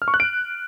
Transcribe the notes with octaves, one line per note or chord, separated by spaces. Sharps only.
F6
C#6
F#6
D7